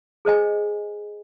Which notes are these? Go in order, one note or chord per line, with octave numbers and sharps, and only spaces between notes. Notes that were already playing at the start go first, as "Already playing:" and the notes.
G#4 C5 D#5 G#5